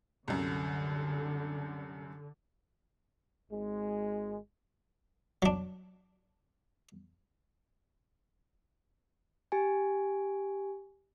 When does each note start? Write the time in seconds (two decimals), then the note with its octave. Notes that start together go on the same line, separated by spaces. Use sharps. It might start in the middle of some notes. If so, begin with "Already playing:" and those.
0.28 C2 F#2 D3
3.50 G#1 G#3
5.42 F#3 D4
9.52 G4 G#5